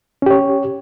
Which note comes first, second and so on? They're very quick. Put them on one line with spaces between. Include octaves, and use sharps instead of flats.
C#4 G4 C#5